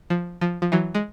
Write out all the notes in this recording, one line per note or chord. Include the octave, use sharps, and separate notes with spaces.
F3
F3
F3
E3 F#3
G#3